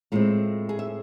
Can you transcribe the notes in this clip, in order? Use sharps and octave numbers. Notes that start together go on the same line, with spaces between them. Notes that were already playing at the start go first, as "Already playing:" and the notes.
A2 G#3 C4 F4
G#4
E5